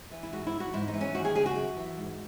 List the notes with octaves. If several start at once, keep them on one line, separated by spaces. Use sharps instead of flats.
E3
E4
G#2 F#4
E4
E3
F#4
G#2 E4
D#4
E3
C#4
D#2 F#4
G#4
C#3 G#4
F#4
F#2
E3
G#2